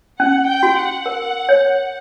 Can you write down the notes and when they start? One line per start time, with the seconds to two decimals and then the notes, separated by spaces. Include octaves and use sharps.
0.19 C#4 F#5
0.48 G5
0.63 F#4
0.77 F#5
1.06 A#4
1.49 C#5